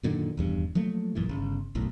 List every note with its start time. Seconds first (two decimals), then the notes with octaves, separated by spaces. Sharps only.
0.03 F#2 A#2 D3 D#3
0.37 D#1 E2 G2
0.75 F3 F#3 A3 A#3
1.15 A1 F#2 A#2 E3
1.29 G1 C#3
1.75 F#1 B1 A2